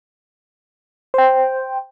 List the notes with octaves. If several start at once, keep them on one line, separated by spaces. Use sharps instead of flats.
C5 G5